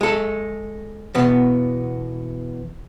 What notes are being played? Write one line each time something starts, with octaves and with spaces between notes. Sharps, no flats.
G#3 A4
E2 B2 B3